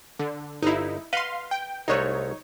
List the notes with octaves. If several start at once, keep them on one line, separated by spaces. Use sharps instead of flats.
D3
G1 D#4 E4 F5
B4 D#5 F5 F#5 C6
G5
C2 G#3 A3 D#4 C#5